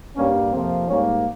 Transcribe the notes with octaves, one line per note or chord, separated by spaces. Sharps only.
G2 G3 A#3 C#4
F2 C3 F3 A#3 C4
G#2 G3 A#3 C#4